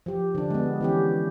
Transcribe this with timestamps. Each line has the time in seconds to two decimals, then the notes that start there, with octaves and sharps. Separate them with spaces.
0.06 F3 G4
0.35 D3 D4
0.50 G#3 B3
0.81 E3 C#4 G4